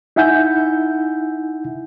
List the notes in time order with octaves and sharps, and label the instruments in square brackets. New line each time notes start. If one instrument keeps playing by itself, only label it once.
[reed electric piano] D#4 E4 E5 F#5 G#5 G6